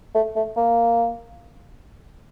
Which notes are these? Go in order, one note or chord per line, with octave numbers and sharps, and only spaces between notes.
A3
A3
A#3